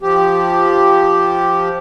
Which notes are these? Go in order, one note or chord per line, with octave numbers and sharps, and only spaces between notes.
F3 G4